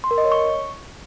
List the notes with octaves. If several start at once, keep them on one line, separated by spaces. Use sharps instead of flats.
C6
A#4
D#5
C#5
C#6